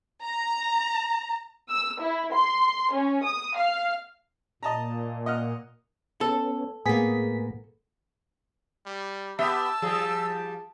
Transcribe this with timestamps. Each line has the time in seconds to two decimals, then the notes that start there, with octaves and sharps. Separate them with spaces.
0.22 A#5
1.69 E6
2.01 E4
2.33 C6
2.92 C#4
3.24 D#6
3.57 F5
4.63 A#2 D#5 A5 A#5
5.26 D#5 F#5 F6
6.21 B3 C#4 A4
6.86 A2 A#3 B3 G#4 B6
8.86 G3
9.39 B3 G4 E5 A5 E6
9.82 F3 G3 G#4